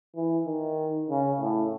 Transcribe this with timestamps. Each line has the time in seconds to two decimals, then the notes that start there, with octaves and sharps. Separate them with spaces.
0.16 E3
0.46 D#3
1.10 C#3
1.40 A2